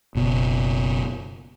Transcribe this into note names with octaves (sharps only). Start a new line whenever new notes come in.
F#1 B2